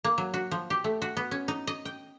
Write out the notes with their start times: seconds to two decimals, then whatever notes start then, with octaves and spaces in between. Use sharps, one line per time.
0.04 A#3
0.18 F#3
0.34 F#4
0.51 F3
0.70 G4
0.84 A3
1.02 F#4
1.17 B3
1.31 C#4
1.48 D#4
1.67 D#5
1.85 G5